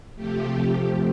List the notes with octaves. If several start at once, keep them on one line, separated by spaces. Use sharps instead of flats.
C3 F3 A3 G4
G4